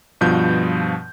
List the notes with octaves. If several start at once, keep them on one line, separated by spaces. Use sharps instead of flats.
G2 B2 F3 G6